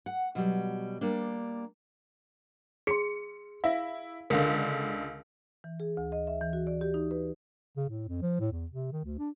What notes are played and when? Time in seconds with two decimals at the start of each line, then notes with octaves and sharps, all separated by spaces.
0.06 F#5
0.35 B2 F#3 G3
1.01 G3 A#3 D4
2.87 G#4 C6 C#7
3.64 E4 E5 F5
4.30 C#2 D3 A#4 F5
5.64 E3
5.80 G#4
5.97 D2
6.12 D#5
6.27 E5
6.41 E3
6.53 F#4
6.67 D5
6.81 G4
6.94 D#4
7.11 B4
7.77 C#3
7.90 A2
8.08 F2
8.22 F3
8.40 A2
8.52 E2
8.71 C3
8.92 D#3
9.05 D2
9.19 D4